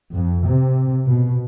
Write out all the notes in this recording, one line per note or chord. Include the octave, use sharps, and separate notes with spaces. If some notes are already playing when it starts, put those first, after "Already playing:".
F2
C3
B2